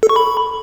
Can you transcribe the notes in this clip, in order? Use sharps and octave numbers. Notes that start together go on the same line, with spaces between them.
A4
C#6
B5